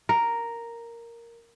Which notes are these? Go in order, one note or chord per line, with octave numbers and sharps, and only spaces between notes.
A#4